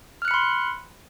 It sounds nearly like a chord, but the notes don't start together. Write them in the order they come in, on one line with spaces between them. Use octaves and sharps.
F6 F#6 C#7 B5 C6